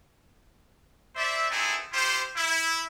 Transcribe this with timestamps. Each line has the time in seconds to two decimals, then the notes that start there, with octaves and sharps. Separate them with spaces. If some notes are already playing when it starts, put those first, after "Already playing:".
1.16 E4 C5 D5 E5
1.51 B3 C4 D#4 E4 G#4 A4
1.93 E4 F4 G4 C5
2.36 E4